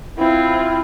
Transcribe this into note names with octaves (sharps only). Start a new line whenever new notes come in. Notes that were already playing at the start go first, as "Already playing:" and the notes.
C4 E4 F4